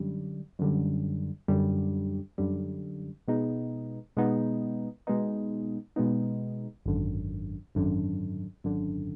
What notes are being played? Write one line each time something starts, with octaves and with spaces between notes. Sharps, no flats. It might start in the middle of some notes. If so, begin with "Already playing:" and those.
Already playing: F#2 D3 G3
F#2 D3 G3
F#2 D3 G3
F#2 D3 G3
B2 G#3 B3 D#4
B2 G#3 B3 D#4
B2 G#3 B3 D#4
B2 G#3 B3 D#4
G#1 F#2 D3
G#1 F#2 D3
G#1 F#2 D3